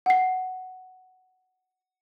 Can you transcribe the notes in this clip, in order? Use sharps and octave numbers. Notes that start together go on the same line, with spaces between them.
F#5 C7